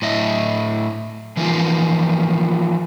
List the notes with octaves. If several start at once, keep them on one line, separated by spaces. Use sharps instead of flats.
A2 D#5 E5
E3 F3 A#3 D#4 F4